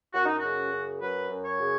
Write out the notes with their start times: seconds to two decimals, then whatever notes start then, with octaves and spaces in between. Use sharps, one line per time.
0.14 F#2 F#4
0.26 D#4
0.38 F#4
0.44 C#3
0.73 F#2
1.01 F#3 B4
1.30 F#2
1.45 C#5
1.59 C#3